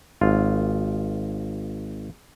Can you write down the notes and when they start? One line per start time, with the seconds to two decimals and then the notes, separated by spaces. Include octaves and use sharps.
0.21 G#1 F4